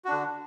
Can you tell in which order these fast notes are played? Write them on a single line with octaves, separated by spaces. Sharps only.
F#4 D4 D3